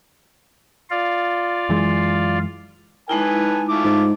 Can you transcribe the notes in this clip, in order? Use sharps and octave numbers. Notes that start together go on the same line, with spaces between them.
F4 D5 F5
F#2 E3 G#3
G#3 D#4 E4 B4 G#5 A5
A3 F4 D6
G#2